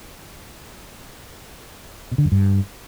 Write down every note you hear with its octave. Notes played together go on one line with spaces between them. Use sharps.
B2
D3
F#2
G2